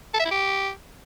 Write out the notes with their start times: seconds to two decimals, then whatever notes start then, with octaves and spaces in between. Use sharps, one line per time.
0.14 A4
0.20 E5
0.26 E4
0.31 G4